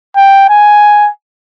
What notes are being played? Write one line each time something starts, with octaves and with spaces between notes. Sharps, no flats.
G5
G#5